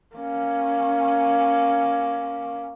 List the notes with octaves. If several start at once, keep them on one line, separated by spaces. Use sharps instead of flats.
A#3 C#4